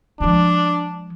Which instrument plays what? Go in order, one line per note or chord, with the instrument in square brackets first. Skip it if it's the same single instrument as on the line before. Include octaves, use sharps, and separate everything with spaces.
[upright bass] F3 G#3 [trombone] D4